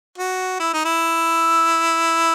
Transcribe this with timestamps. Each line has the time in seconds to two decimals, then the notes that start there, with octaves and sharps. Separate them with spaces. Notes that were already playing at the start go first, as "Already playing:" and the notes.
0.18 F#4
0.59 E4
0.73 D#4
0.85 E4